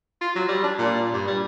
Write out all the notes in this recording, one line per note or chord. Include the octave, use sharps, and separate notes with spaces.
F4
F#3
G3
D4
A#2
G2
G3